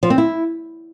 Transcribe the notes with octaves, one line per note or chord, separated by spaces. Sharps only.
F3
C4
E4